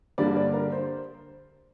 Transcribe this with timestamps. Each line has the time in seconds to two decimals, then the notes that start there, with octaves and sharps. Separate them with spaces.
0.18 G2 D3 G3 A#3 D5
0.36 D5
0.54 A#4
0.72 C5